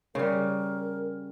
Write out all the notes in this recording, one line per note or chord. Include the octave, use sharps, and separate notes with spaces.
C#3 G3 A#4